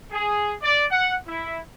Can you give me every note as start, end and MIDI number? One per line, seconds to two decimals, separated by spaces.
0.11 0.54 68
0.62 0.85 74
0.91 1.14 78
1.28 1.59 64